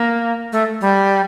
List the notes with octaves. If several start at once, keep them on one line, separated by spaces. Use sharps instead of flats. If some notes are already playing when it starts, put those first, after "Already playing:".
Already playing: A#3
A3
G3